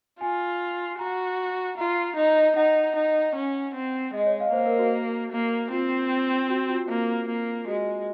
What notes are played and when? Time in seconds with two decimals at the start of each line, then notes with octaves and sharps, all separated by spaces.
0.21 F4 G#5
0.99 F#4 A#5
1.78 F4 A#5
2.16 D#4
2.56 D#4 F#5
2.96 D#4
3.35 C#4
3.74 C4
4.14 G#3 D#5
4.27 C#5
4.40 F5
4.53 A#3 C5
4.66 A#4
4.79 F#4
5.31 A#3
5.71 C4 F4
6.49 F#4
6.69 F4
6.89 A#3
7.28 A#3
7.67 G#3 F#4